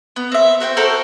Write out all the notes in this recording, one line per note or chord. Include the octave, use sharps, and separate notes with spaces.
B3
C4 E5
F#4 C5 F#5 G5
F#4 A4 A#4 C5